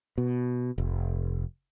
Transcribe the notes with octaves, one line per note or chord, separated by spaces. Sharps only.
B2
F1